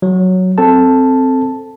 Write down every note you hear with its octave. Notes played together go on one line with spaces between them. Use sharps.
F#3
C4 A4 A5